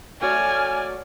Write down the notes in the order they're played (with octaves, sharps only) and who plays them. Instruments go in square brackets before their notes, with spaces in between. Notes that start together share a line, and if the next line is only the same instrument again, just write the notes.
[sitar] A3 F#4 C#5 [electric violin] D5 F6 [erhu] G#5